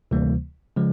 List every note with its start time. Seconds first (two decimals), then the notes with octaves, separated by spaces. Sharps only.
0.11 D2 C3 E3 G3 A#3
0.76 C#3 F3 G#3